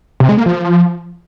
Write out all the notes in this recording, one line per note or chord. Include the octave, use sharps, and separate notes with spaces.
C3
G#3
A#3
F3